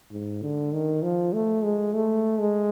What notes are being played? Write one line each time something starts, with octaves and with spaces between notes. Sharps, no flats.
G#2
D3
D#3
F3
A3
G#3
A3
G#3